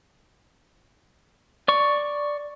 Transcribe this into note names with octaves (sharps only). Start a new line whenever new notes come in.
D5 C#6